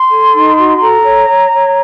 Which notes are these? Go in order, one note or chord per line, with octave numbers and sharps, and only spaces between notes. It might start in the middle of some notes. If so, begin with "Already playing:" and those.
Already playing: C6
A4
D#4
F#4
A4 A#5
C#5
C#5
C#5